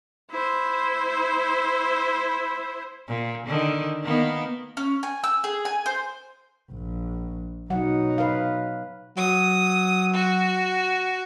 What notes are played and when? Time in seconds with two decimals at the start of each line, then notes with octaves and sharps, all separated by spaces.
0.31 E4 C5
3.07 A#2
3.46 D3 D#3
4.03 D#3 A#3 B3
4.77 C#4
5.03 G#5
5.24 E6
5.44 G#4
5.65 G#5
5.86 C5
6.71 A#1
7.70 B2 F#3 D#4 F#5
8.18 B4 F5
9.17 F#3 D#6
10.13 F#4